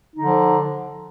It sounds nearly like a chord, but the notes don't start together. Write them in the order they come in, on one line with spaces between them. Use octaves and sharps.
D#4 D3 F3